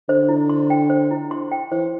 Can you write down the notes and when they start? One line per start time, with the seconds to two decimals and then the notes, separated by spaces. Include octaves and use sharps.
0.08 D3 C5
0.29 E4
0.49 C6
0.70 G5
0.90 C5
1.11 E4
1.31 C6
1.52 G5
1.72 E3 C5